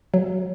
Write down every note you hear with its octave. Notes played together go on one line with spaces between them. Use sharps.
F#3